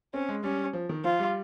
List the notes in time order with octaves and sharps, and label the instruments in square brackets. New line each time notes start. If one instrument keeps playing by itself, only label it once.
[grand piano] C4 [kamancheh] C#4
[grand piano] G#3
[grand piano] G3 [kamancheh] C#4
[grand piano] F3
D#3
[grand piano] F3 [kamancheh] F4
[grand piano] G3